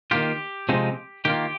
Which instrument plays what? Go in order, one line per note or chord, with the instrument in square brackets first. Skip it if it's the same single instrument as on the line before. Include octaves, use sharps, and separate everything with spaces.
[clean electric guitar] D#3 A#3 F4 G4
C3 F3 G#3 C4 D#4
D#3 A#3 F4 G4